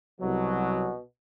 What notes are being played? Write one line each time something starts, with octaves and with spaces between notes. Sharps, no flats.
C2 B2 F#3